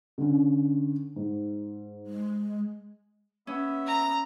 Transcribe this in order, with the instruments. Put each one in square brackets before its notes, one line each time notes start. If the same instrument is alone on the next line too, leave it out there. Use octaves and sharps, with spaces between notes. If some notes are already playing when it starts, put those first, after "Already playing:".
[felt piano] D3 C#4
G#2
[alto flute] G#3
[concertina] B3 E5 [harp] C#4
[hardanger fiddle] A#5